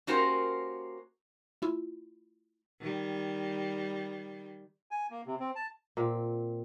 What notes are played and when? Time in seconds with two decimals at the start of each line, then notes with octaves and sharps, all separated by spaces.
0.07 A#3 C#4 F#4 G4 A#4 C5
1.62 A3 E4 F4
2.81 D#3 G3
4.91 G#5
5.11 A#3
5.26 C3
5.40 C4
5.56 A5
5.97 A#2 C4